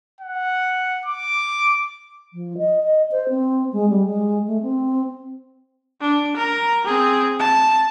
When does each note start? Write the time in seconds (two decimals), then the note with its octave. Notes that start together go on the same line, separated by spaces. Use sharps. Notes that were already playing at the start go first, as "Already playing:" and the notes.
0.21 F#5
1.05 D6
2.33 F3
2.58 D#5
2.83 D#5
3.11 C5
3.29 C4
3.73 G#3
3.89 G3
4.05 G#3
4.47 A3
4.62 C4
6.01 D4
6.37 A#4 A#5
6.86 C4 G#4
7.40 A5